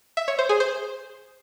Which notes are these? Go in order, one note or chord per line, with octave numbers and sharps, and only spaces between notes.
E5
C#5
C5
G#4
C5